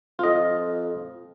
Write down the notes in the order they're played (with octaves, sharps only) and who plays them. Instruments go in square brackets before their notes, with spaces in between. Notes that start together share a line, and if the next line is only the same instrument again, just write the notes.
[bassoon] F2 [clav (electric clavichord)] F4 D#5